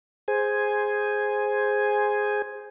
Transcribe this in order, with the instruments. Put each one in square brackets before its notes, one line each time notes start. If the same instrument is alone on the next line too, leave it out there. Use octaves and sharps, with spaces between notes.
[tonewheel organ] G#4 C5 G#5